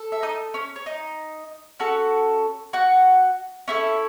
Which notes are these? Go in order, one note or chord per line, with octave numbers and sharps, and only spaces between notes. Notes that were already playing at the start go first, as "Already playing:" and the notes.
Already playing: A4
E5
D#4 D#5
C#4 C#5
C#5
D#4 D#5
C#4 F#4 A4
F#4 F#5
C#4 E4 A4